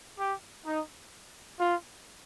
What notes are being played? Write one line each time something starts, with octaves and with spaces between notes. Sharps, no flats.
G4
D#4
F4